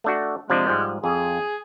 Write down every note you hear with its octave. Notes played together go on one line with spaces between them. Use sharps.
A3 D4 F#4
C3 F3 G#3 D4
G#2 F3 G3
F2 G#4